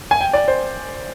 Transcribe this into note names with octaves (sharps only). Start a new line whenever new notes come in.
G#5
G5
D5
C5